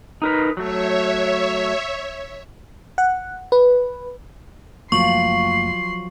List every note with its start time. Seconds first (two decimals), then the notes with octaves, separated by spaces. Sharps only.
0.22 D#4 A#4 B4
0.57 F#3 A3 C#5 E5
2.98 F#5
3.52 B4
4.92 F#1 F3 F#3 A3 A#3 C6 C#6 F#7